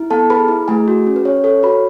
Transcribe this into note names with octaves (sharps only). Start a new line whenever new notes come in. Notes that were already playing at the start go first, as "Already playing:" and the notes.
Already playing: E4
B3 A4 A5
G#4 B4 B5
E4
A3 G#4 G#5
F#4
C#4
B4
C#4 C#5
A4 C#5
F#4 B4 B5